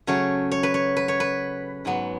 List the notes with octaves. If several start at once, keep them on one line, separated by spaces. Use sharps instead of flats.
C#3 F#3 A3 C#5
C#5
B4
C#5
B4
C#5
B4
G#2 F#3 B3